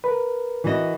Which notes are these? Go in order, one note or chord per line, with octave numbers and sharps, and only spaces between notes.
A#4 B4
E3 F#4 D#5